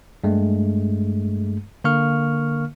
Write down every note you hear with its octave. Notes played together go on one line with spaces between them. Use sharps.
G2 G#3 A3
D3 A#3 A#4 F5 C#6 F6